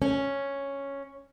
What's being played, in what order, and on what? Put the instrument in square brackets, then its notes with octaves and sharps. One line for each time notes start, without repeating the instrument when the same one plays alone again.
[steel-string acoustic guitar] C#4